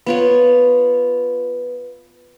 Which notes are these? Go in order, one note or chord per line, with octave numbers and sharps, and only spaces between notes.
B3 F4 C#5